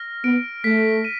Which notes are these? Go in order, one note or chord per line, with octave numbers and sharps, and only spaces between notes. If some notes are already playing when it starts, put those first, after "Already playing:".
Already playing: F6 A#6
B3 D7
A3 B6
D#7